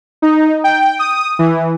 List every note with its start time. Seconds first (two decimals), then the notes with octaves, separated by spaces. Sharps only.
0.22 D#4
0.64 G5
0.99 D#6
1.39 E3